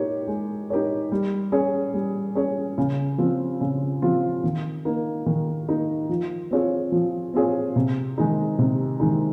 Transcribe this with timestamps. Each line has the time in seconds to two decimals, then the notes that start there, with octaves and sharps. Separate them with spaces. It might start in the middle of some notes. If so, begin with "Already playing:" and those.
Already playing: D#4 G4 A#4 C#5
0.28 G#3
0.70 D#4 G4 A#4 C#5
1.12 G3
1.52 C#4 G#4 C#5
1.94 G3
2.35 C#4 G#4 C#5
2.78 C#3
3.18 F3 C4 F4
3.61 C#3
4.02 F3 C4 F4
4.44 D#3
4.85 A#3 D#4
5.26 D#3
5.69 A#3 D#4
6.09 F3
6.51 C4 F4 G#4 C#5
6.92 F3
7.34 C4 F4 G#4 C#5
7.76 C3
8.18 D#3 G#3 D#4
8.59 C3
9.00 D#3 G#3 D#4